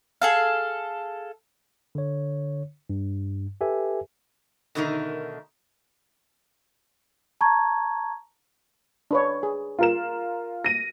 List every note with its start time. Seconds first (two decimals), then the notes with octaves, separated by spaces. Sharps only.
0.22 G#4 A4 F5
1.95 D3 C#5
2.90 G2
3.61 G4 A4 B4 E5 G#5
4.75 B2 D3 D#3 A3 D#4 A#4
7.41 A5 A#5 C#6 G#6
9.11 D4 B4 C#5
9.43 G#4
9.79 F4 A#4 E7
10.65 A#6 D#7